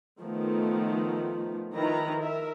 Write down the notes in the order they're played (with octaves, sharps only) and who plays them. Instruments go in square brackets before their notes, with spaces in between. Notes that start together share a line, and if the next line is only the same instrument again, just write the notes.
[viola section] D#3 F3 A3 B3
D#3 F3 E4 B4 A#5
A#4 E5